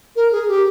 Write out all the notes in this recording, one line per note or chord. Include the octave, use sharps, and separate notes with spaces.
A#4
G#4
G4